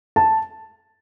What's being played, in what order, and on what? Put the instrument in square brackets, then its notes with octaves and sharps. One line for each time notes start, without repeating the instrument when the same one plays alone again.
[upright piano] A5